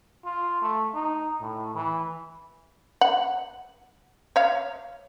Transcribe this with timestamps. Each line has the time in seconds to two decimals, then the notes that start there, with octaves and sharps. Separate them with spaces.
0.25 F4
0.62 A3
0.94 D#4
1.41 A2
1.74 E3
3.01 F#5
4.36 C#5 F5